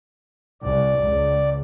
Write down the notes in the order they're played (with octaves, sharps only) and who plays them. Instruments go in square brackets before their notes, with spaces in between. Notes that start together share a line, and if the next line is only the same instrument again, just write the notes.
[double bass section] C2 [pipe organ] D5
[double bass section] C#2